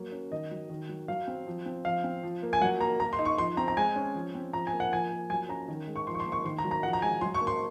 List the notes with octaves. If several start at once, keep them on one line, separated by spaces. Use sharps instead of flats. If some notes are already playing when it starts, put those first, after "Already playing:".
Already playing: F#3 A#3
C#4
D#3 D#5
F#3
D#3
F#3
F#3 F5
C4
F3
C4
F3 F5
C4
F3
A#3
G#5
F#3 F#5
A#3 A#5
A#3 A#5
C6
D#4
C#6
F3 C6
C4 A#5
A#5
G#3 G#5
C#4
F3
C4
F3 A#5
G#5
A#3
F#5
F3 G#5
A#3
F#3 G#5
C#4 A#5
D#3
G#3
C#6
F3 C6
C#6
C6
A#3
C#6
D#3 C6
A#5
F#3
A#5
F3 F#5
A#5
G#3 G#5
F#3 C6
C#6
A#3
C6